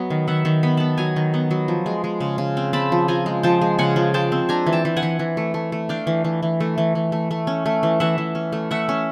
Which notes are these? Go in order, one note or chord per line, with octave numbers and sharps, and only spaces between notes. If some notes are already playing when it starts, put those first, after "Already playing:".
Already playing: F#3 B3 D#5
D#3
D#3 E5 F#5
D#3
B3 B5
B3 A5 B5
F#3 G#5 A#5
D#3
B3
F#3
F3
G#3
G#3
C#3
C#3
C4
C4 A5 B5
F3
F3 G#5 A#5
G#3
F3 G5 A5
G#3
C#3 F#5 G#5
F3
G#3 G5 A5
C4
D4 G#5 A#5
E3
G5 A5
E3
F#5 G#5
E3
E3
A3
A3
A3
D4 F5 G5
E3
E3
E3
A3
E3
E3
A3
A3
C#4
A3
E3
E3 E5 F#5
E3
C#4
A3
A3 E5 F#5
C#4